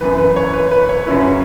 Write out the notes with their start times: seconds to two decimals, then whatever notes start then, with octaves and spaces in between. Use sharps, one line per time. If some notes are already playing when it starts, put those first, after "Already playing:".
0.01 F#2 E3 B3 B4
0.18 B4
0.36 C#5
0.54 B4
0.71 B4
0.89 C#5
1.06 F#2 C#3 F#3 C#4 E4 B4